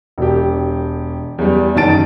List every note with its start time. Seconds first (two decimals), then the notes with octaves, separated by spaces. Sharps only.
0.18 E1 G4
1.38 E2 G3
1.76 F#1 D#3 A5 A6 D7